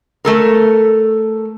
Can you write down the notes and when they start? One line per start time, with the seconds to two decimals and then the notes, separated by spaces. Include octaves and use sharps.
0.25 A3 A4 A#4